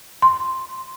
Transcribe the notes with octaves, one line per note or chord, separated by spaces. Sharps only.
C6